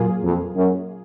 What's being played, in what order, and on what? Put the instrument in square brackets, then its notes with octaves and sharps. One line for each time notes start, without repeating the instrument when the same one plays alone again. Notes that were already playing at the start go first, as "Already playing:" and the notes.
Already playing: [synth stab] A#2 F#3 A#3 F4 G#4
[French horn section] F2
F#2